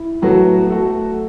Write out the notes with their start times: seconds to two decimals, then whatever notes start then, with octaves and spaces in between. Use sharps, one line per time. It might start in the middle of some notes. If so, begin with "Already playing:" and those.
Already playing: E4
0.22 A2 F#3 B3 F#4 A4
0.70 A3 F#4 A4